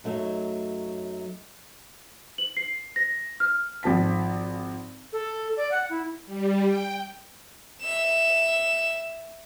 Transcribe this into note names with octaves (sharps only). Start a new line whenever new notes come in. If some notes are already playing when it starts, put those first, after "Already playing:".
F#2 F#3 A3 D#4
F#7
C7
A#6
F6
G#1 F3 A5 B6
A4
D5
F#5
E4
G3
G5
E5 E7